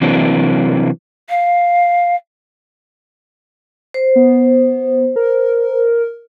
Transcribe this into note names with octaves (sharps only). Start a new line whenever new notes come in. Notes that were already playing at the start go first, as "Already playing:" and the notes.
C3 E3 F#3 A#3 C4 D4
F5
C5
B3
A#4